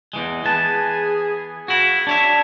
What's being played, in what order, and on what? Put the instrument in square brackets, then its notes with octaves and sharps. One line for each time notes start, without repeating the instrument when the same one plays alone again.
[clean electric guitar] E2 E3 G#3
[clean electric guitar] E3 B3 A5 [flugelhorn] G#4
[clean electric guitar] E4 F#4
D4 C#5 E5